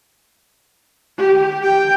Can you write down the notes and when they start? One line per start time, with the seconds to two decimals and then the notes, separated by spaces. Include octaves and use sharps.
1.19 G4
1.63 G5